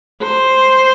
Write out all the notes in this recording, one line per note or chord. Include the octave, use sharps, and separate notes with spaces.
C5